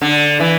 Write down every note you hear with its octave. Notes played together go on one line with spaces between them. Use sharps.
D3
E3